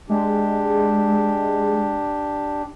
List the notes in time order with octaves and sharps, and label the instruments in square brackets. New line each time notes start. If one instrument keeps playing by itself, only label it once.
[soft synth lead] G#3 [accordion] D4 G4